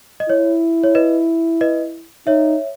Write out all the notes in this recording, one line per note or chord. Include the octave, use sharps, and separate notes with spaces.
D#5
E4 C#5
C#5
B4 D#5
B4 D#5
D#4 C#5 E5